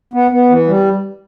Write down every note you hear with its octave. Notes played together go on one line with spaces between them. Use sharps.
B3
B3
E3
G3